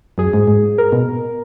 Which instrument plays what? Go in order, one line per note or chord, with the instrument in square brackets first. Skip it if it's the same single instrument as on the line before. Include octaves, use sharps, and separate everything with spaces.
[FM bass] F#2 [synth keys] G#4
[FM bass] G#2
G#2
[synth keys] A#4
[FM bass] B2